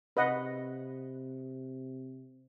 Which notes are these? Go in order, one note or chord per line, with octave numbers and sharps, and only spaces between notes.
C3 B4 D#5 F#5